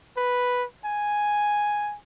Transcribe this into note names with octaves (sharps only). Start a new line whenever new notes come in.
B4
G#5